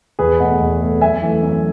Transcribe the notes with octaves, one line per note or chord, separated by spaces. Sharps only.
E2 G#4 B4
B2 A3 D#5 F#5
E2
B2 A3
F#2 E5 G#5
E3 A3
F#2